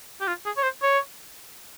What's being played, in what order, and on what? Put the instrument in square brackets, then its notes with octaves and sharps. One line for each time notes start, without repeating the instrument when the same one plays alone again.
[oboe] G4
F4
G#4
C#5
C5
C#5